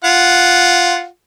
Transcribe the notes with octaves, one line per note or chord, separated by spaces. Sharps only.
F4 F#5